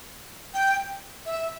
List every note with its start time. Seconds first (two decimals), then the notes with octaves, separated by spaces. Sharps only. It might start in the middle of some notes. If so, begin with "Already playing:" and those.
0.54 G5
1.26 E5